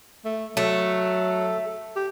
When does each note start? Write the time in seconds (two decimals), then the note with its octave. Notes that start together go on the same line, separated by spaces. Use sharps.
0.25 A3
0.57 F#3 A3 A4
1.96 G4